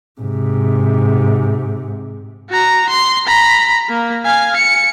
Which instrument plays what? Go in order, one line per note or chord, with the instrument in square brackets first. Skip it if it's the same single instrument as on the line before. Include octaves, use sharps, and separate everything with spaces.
[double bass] G#2 C3
[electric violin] F#4 A#5
C6
A#5 B5
A#3
F5 G#5
C#7